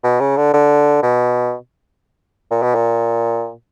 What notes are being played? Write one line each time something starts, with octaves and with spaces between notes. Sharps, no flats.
B2
C#3
D3
D3
B2
A#2
B2
A#2